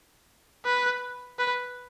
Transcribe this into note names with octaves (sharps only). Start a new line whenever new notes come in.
B4
B4